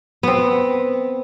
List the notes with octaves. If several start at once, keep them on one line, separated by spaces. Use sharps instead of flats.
B3 C4